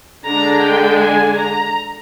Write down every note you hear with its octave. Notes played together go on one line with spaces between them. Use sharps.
D3 G#3 D4 A#5
G5
G#5
A#5